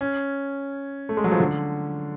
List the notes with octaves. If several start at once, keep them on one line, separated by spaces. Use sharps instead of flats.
C#4
A3
G#3
F#3
F3
D3